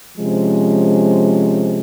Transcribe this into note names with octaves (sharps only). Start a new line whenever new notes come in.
C3 F3 G#3 C#4